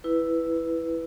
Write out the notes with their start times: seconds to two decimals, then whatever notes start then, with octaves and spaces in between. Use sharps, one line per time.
0.04 E4 B4